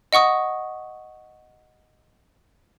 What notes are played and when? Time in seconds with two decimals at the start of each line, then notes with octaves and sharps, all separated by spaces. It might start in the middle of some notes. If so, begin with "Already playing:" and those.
0.13 D#5 F#5 C#6 D#6